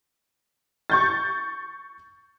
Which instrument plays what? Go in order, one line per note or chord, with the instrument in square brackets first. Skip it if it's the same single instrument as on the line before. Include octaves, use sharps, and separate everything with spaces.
[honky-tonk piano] C#6 G6 A6